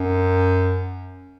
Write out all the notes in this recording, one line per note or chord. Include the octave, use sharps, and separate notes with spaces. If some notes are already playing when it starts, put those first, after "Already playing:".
Already playing: F#2